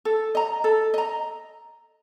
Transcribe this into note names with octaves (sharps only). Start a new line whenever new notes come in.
A4
D#5 A#5
A4
D#5 A#5